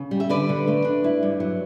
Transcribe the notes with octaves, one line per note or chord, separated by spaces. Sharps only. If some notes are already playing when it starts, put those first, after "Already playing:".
Already playing: C#3
G3
E5
D3 B4 D5
D3
A3
D4
E4
G2
F#3